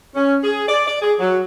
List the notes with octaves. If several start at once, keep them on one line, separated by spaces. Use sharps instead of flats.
C#4
G#4
D5
D5
G#4
F#3